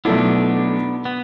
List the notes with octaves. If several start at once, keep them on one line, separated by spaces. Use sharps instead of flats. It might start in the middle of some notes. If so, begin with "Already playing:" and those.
B1 B2 A3 B3 D4 E4
B3